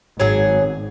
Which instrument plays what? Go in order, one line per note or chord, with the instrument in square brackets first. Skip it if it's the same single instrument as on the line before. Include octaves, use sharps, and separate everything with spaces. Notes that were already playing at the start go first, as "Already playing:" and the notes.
[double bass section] G#1 [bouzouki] F#3 G#4